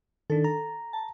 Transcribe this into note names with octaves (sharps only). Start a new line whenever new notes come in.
D#3 D4 A4
A#5
A5